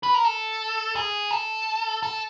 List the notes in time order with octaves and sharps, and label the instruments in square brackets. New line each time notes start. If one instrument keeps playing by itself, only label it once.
[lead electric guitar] B4
A#4
A4
G#4
A4
A4